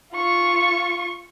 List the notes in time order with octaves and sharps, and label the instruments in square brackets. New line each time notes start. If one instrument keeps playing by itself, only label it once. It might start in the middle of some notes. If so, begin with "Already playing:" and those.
[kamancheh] F4 C#6